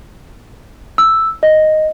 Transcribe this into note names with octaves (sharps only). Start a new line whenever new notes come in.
E6
D#5